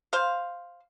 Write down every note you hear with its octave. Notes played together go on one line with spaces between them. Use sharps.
C5 F5